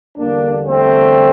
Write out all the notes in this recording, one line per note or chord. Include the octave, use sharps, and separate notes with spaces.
E2 D3 G3 A#3 D4
A3 C4